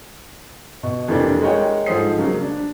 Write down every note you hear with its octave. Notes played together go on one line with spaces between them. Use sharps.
B2
F2 C3 E3 A#3 D4
G#3 A#4 C#5 F#5 G5
G#2 F3 A4 C5 D#6 C7
C#3 F#3 A#3
D4